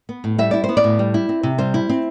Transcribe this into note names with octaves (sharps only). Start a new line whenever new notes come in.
B3
A2
G3 E5
E4 D5
C5
B3
D5
A2
G3
E4
C4
C3
G3 C5
E4
C4